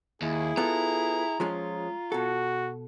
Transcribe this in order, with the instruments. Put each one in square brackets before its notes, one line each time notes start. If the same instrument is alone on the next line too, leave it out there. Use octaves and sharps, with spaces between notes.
[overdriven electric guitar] D#2 [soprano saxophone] E4 [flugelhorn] G#4
[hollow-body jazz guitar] B3 F4 A4 [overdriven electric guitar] A#5
[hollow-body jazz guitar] F3 G#3 C#4 [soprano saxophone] F4
[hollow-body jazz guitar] B2 A4 [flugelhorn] F#4